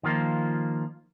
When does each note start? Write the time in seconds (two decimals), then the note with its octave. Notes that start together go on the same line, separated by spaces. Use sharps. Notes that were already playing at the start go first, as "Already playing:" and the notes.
0.03 D#3 F3 A#3 F4